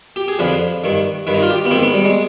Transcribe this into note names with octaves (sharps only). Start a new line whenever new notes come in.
G4
G#4
F2 D3 F3 B4
G2 D#3
G2 D#3 B4
D#4
F4
G4
B3
G#2 D#3 C4
B3
G3
G#3